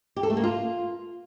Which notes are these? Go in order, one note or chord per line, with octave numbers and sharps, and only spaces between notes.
G4
A4
A3
A#3
F4